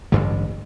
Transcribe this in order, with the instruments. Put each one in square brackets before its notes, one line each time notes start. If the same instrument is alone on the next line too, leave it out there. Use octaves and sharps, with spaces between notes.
[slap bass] A1 G2 D3 A3